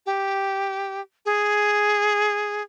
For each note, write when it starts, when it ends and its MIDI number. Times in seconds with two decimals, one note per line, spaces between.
0.06 1.01 67
1.26 2.62 68